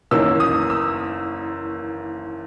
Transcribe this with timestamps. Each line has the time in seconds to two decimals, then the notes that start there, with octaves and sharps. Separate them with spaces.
0.11 F#1 E2 D#3 A#3 C#4 E6
0.40 D#6
0.70 E6